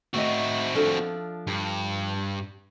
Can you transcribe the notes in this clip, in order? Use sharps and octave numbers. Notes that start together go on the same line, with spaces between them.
A3 C4 F#4 D#5
F3 D4 A4
G2